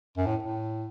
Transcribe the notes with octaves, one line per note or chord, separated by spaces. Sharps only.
F#2
A2
A2